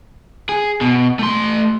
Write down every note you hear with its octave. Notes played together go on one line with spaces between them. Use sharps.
G#4
B2
A3 C6